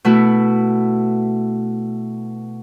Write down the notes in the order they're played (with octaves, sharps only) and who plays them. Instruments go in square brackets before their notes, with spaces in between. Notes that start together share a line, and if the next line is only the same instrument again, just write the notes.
[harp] B2 A3 E4 F#4